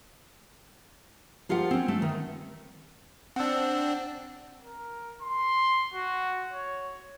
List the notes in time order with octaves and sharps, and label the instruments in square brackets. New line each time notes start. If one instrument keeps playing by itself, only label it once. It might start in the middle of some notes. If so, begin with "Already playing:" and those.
[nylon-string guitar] F3 F4 G4 A#4 F#5
C4 C#4
A3
D#3
[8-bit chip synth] C4 D4 [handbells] F#5 E6
[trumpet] A#4
C6
F#4
C#5